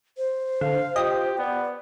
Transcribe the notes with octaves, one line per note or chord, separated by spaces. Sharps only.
C5
D3 F5
F4 G4 D#5
B3 D5